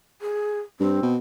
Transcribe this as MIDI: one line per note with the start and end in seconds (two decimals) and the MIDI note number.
0.22 0.60 68
0.80 1.00 43
0.80 1.11 60
1.02 1.17 47